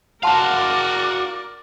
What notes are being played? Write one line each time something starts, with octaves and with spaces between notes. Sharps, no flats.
F#4 A#4 D5 F5 F#5 A5 C6